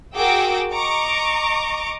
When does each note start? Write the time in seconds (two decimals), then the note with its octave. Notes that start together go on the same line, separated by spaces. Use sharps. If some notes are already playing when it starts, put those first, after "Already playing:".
0.16 F#4 G#4 A#4 G5 D6 E6
0.72 D#5 A#5 C#6 D6